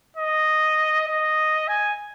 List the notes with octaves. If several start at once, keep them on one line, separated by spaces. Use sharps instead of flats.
D#5
D#5
G#5